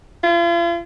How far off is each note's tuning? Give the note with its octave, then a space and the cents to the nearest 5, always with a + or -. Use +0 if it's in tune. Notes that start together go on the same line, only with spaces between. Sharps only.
F4 -40